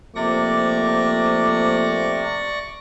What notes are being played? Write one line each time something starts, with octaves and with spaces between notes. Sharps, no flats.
C3 F3 A3 A#3 D5 C#6 D6 A#6